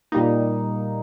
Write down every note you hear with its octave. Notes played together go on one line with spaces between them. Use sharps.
A#2 G3 A#3 D#4